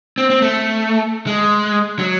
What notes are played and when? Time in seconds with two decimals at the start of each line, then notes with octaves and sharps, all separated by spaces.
0.18 C4
0.30 C4
0.42 A3
1.27 G#3
1.99 F#3